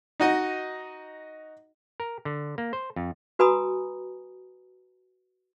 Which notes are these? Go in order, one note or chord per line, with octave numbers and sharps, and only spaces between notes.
D#4 F#4 D#5
A#4
D3
A#3
C5
F2
F#4 B4 G#5 A#5 B5 D#6